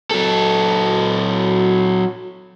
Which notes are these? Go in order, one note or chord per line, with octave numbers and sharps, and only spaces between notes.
F#3 A4